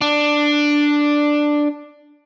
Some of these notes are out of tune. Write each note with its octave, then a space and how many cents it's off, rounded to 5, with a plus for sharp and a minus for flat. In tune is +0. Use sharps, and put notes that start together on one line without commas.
D4 +5